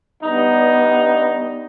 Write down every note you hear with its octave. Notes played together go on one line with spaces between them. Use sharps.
G2 B3 D#4